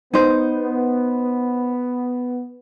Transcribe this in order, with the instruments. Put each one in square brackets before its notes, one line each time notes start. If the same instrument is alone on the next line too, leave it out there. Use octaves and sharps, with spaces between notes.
[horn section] B3 [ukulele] D#4 C5